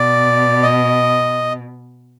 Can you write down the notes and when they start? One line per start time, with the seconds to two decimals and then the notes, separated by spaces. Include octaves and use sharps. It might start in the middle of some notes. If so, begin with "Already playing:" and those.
Already playing: B2 D5
0.62 D#5